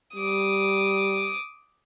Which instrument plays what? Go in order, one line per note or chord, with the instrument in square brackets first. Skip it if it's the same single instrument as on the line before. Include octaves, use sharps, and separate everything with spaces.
[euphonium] G3 [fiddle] D6 D#6